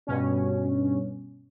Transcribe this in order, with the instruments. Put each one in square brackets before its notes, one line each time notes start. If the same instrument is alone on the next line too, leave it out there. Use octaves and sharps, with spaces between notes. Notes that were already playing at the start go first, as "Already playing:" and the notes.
[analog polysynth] G2 B2 C#4